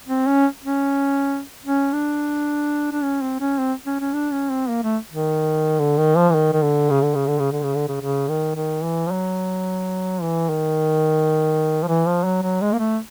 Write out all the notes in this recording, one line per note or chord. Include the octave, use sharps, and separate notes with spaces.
C4
C#4
C#4
C#4
D4
D4
C#4
C4
C#4
C4
C#4
C#4
D4
C#4
C4
A#3
A3
D#3
D3
D#3
F3
E3
D#3
D#3
D3
C#3
D3
C#3
D3
C#3
D3
C#3
D3
C#3
C#3
D#3
D#3
E3
F3
F#3
E3
D#3
F3
E3
F3
F#3
F#3
G#3
A#3
A3